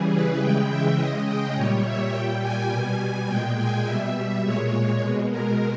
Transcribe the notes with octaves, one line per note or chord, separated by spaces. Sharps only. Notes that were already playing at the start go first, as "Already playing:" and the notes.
Already playing: C#3 E3 G3 G#4
B4
C#3 E3 G#3 G5
E5
C#3 G#3 D#5
G5
A#2 G3 C#5
E5
A#2 G3 G5
G#5
B2 G3
G#5
A#2 G#3 G5
G#5
B2 G3 E5
A#2 G#3 C#5
B2 G#3
A#4